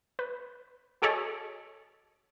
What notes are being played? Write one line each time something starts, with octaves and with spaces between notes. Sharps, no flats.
B4
F#4 G#4 A4 C#5 D#5